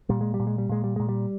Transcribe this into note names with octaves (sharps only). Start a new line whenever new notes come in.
A#2 G3
G#3
G3
A#2
G#3
G3
A#2 G#3
G3
A#2 G#3
G3